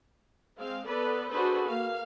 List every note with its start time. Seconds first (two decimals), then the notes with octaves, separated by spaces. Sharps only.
0.58 G#3 C4 F5
0.88 B3 A4 B4 D5
1.31 D4 F#4 G#4 A4 B4 C5
1.66 A#3 F5